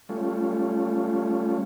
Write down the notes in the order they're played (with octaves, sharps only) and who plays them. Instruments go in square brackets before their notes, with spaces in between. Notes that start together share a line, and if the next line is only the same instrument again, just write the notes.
[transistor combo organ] G3 A3 C#4 F4